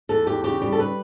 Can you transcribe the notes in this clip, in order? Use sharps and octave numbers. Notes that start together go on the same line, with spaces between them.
E2 A4
E2 G4
C#3 G4
G3 G4
A4
B4